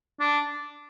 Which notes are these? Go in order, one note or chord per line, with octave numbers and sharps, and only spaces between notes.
D4